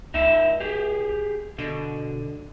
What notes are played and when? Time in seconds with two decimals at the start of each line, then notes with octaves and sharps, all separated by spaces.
0.14 C#2 D#4 E5
0.60 G4 G#4
1.58 B2 D3